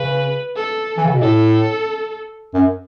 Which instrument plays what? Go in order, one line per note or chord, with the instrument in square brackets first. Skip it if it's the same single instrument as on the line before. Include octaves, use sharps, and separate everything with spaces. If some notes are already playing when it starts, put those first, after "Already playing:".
Already playing: [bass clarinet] C#3 [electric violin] B4
[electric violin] A4
[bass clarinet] E3
C#3
B2
[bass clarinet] A2 [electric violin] A4
[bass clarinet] F#2